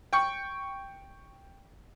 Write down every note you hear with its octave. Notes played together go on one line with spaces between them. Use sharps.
G5 C#6